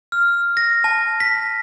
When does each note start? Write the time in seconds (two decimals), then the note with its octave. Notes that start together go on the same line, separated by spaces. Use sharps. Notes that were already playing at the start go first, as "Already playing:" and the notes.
0.12 F6
0.57 A#6
0.84 A5
1.20 B6